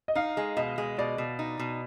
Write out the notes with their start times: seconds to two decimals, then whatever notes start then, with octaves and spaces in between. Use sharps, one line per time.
0.08 D#5
0.15 D#4 F5
0.37 G#3
0.57 B2 D#5
0.78 G#3
0.98 B2 D5
1.18 B2
1.39 D#4
1.59 B2